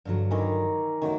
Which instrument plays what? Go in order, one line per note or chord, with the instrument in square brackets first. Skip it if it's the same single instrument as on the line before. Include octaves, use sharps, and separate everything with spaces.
[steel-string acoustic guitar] G2 D3 F#3
[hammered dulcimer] D#3 E3 A#4
[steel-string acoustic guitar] D2 E4 [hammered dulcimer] D#3 F#3